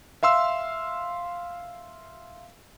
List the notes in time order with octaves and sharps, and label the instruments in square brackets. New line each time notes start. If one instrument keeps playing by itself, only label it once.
[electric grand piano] E5 F5 C6 E6